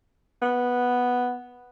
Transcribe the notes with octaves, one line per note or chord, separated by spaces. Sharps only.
B3